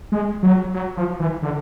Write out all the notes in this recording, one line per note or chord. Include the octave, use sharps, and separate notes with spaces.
G#3
F#3
F#3
F3
E3
D3